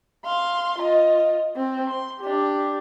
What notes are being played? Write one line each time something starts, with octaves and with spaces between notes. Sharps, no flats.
F5 C6
F4 D#5
C4
C6
D4 G4